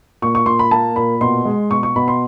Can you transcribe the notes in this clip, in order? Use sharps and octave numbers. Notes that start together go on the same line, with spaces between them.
A#2 C#6
C#6
A#2 C6
B5
A#3 A5
A#2 B5
B2 C6
G#3
B2 C#6
C#6
B2 B5
C6